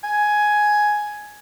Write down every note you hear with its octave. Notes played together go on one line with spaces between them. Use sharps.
G#5